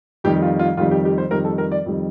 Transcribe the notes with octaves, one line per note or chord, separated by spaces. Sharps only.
F2 D#3 G3 G4
F4
F4
F2 D#3 G3 F4
G4
G4
C5
F2 D#3 G3 A#4
A4
A#4
D5
F2 D#3 G3